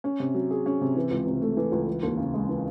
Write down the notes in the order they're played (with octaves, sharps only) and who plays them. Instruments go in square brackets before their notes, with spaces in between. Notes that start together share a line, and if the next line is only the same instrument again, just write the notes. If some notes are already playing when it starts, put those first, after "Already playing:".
[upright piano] C#4
C3
F#3
G#4
C#4
C3
E3
C#2
C3
A3
E3
C#2
E3
D#2
C#3
G#3
E3